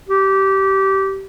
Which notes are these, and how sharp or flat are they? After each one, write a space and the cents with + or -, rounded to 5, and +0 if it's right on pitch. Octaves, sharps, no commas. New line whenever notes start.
G4 -20